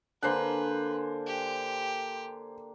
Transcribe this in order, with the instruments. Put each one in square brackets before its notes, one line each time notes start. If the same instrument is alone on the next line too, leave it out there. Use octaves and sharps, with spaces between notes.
[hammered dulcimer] D3 A#3 [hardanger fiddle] B4 [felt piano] C5 G#5 F#6
[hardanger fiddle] G4